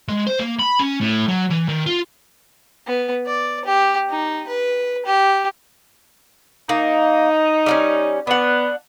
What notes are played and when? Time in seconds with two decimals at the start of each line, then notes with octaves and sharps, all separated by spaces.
0.09 G#3
0.27 C5
0.39 A#3
0.59 B5
0.79 C#4
1.01 A2
1.29 F#3
1.51 E3
1.69 D#3
1.86 F4
2.87 B3
3.26 D5
3.65 G4
4.10 D#4
4.48 B4
5.06 G4
6.69 A#3 D#4
7.66 G3 A#3 C#4
8.27 B3 D4 F#5